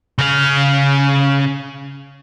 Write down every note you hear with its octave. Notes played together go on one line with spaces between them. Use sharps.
C#3 F5